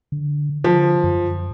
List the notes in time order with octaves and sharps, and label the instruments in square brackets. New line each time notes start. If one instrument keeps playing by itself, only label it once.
[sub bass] D3
[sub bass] D3 [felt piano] F3
[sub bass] F#2